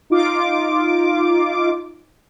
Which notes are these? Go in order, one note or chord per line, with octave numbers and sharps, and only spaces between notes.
D#4 F4 D6